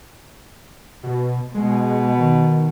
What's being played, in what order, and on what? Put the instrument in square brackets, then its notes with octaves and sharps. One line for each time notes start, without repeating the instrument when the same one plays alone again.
[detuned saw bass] B2
[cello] B2 [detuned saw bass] G#3
[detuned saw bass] D#3